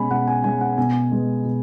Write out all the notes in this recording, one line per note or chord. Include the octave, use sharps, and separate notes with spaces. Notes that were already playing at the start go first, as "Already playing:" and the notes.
Already playing: B2 G#3 C#4 G#5 B5
B2 F#5
G#5
G#3 C#4 G#5
F#5
B2 G#5
G#3 B3
B2